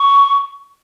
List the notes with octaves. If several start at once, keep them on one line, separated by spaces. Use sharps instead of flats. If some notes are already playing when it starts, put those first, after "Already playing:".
Already playing: C#6